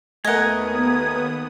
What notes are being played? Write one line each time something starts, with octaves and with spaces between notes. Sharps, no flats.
D#2 A3 B3 A#4 D#5 F#5 G#5 D#6